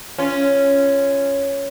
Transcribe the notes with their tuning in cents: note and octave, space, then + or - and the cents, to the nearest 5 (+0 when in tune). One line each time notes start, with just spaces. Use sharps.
C#4 +0 F4 -20